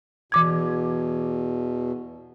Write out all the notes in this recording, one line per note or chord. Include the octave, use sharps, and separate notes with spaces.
E2 B2 E3 D6 G#6